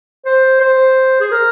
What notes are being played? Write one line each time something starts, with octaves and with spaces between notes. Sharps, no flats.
C5
C5
G#4
A#4